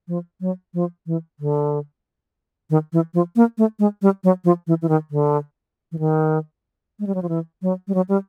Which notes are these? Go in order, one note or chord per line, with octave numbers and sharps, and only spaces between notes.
F3
F#3
F3
E3
D3
D#3
E3
F3
A#3
A3
G#3
G3
F#3
F3
E3
E3
D#3
D3
E3
D#3
G#3
G3
F#3
F3
E3
F#3
G3
F#3
G3